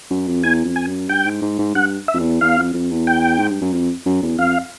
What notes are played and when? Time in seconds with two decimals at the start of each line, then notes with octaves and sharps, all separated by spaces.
0.11 F#2
0.27 F2
0.44 E2 G#5
0.65 F2
0.76 G#5
0.87 F#2
1.09 G2 G5
1.26 G#2
1.42 G#2
1.59 G#2
1.75 G2 F#5
2.08 E5
2.14 F2
2.19 E2
2.41 E2 F5
2.58 F2
2.74 F2
2.91 E2
3.07 G5
3.38 G#2
3.50 G2
3.61 F#2
3.72 F2
4.06 F#2
4.22 E2
4.38 F2 F5